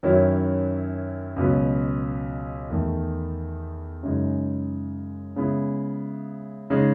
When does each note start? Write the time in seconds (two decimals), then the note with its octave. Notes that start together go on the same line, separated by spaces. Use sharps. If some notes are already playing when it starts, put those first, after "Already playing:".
0.03 F#2 D#3 F#3 C#4 E4
1.36 C#2 B2 F#3 B3
2.70 E2 D#3 A3
4.03 F#2 C#3 G#3 D#4
5.36 C#3 G#3 B3 E4
6.70 C#3 G#3 D#4